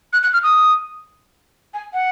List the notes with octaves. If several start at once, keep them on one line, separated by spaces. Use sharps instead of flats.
F#6
F#6
F6
D#6
G#5
F#5